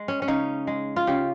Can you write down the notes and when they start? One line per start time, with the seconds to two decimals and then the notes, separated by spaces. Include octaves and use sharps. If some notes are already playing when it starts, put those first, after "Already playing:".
Already playing: G#3
0.08 C#4
0.22 C#4
0.28 C#3 D#4
0.67 G#3
0.96 F4
1.07 C#3 G4